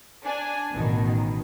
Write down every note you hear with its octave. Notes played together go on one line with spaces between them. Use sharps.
D4 G#5
A1 B2 D#3